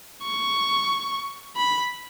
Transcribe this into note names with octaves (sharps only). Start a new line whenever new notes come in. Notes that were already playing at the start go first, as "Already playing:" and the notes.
C#6
B5